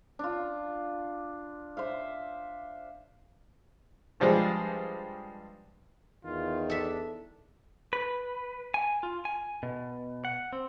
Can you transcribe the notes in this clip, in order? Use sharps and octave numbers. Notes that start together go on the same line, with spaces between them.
D4 F4
C5 E5 F5
G2 F3 G3 G#3
E2 D#3 F4
D4 A4 E5
B4
G#5
F4
G#5
B2
F#5
C4